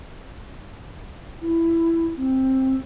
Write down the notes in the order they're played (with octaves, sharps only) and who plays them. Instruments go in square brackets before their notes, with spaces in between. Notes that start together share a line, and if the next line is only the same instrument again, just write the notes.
[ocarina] E4
C4